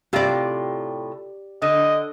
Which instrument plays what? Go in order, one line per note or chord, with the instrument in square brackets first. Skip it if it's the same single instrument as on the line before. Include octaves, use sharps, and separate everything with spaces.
[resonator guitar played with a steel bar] A2 C3 F4 [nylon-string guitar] G4 D5
[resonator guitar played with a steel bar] D3 [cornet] D#5